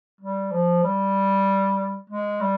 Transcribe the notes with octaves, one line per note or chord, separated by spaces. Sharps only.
G3
F3
G3
G#3
G3